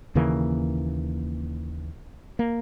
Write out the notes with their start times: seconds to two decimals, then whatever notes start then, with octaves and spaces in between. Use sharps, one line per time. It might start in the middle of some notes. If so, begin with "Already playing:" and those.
0.15 D#2 C#3 E3 A#3
2.39 A#3